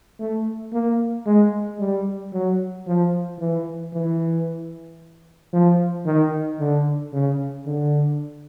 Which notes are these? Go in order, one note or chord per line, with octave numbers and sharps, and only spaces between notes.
A3
A#3
G#3
G3
F#3
F3
E3
E3
F3
D#3
D3
C#3
D3